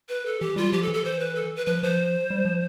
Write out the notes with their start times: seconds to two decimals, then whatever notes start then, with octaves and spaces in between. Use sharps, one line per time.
0.09 B4
0.26 A4
0.41 E3 G4
0.56 G3 F4
0.73 F3 G4
0.82 A4
0.88 E3
0.94 A4
1.04 C5
1.20 B4
1.35 A4
1.56 B4
1.66 F3 B4
1.83 F3 C5
2.30 G3
2.45 F3